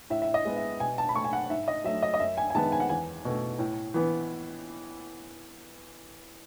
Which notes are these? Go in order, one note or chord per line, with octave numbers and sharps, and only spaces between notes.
A2 E5
E5
D#5
G#3 B3
E5
B2 G#5
A5
B5
A3 C#6
G#5
F#5
G#2 E5
D#5
F#3 A3 E5
D#5
D#5
F#2 E5
G#5
G#5
D#3 G#3 B3 A5
G#5
F#5
E2 G#5
B2 A3
A2
E3 B3